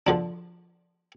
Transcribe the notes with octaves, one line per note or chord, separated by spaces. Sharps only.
D3 F3 D4